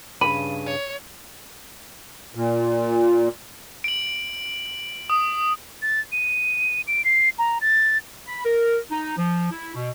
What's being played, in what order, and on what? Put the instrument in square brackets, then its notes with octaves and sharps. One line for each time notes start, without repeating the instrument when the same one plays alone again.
[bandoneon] G2 C#3 [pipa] B5 [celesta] D#7
[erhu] C#5
[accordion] A#2
[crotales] D7 F#7
D#6
[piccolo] A6
D#7
D7
C7
A#5
A6
[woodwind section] B5
A#4
D#4
F3
E4
B2